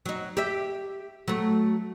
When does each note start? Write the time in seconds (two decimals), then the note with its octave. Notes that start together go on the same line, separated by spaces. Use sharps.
0.06 F#3 D#4
0.37 G4 E5
1.28 F#3 A3